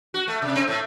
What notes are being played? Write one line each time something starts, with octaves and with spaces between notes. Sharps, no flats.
F#4
A3
C3
C4
A2